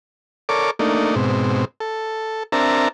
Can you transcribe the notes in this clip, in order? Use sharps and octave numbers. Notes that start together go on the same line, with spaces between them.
A4 A#4 C#5 D5 D6
A3 A#3 D4 D#4
G#2 B2 C4
A4
C4 D4 A#4 E5 A5 A#5